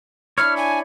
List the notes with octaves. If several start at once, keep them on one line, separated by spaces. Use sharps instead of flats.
D4 E4 C#5 F6
G#5